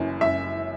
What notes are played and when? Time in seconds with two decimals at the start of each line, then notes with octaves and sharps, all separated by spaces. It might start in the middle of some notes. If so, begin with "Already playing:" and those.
Already playing: F#1 F#2 E3
0.21 F#2 E5